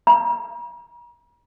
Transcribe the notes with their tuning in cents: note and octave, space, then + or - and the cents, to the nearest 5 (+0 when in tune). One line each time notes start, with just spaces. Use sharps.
A#5 +45